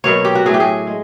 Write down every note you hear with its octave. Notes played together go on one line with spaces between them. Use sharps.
B2 F#3 A#3 C#5
G4
F#4
A2 F#3 A3 G#4
G4
G#4
G#3